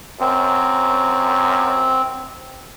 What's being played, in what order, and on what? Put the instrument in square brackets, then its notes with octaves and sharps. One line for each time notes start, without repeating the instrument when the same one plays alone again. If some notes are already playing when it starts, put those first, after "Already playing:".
[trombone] F#2 [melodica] C4